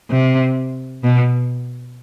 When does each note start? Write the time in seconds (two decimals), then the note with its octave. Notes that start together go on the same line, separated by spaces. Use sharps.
0.10 C3
1.04 B2